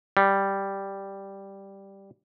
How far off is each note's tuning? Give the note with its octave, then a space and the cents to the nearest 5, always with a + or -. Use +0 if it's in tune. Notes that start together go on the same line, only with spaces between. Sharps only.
G3 +0